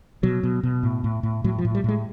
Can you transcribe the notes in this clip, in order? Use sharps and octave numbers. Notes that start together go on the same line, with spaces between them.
B2 F#3
B2
B2
A2
A2
A2
A2 F#3
F3
A2
G3
A2 G#3